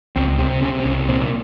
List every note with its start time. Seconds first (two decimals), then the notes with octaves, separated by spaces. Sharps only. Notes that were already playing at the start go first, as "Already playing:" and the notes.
0.16 C#2 C4
0.39 C3 C4
0.62 C3 C#4
0.80 C4
0.85 C2 C#4
1.08 A#2 C4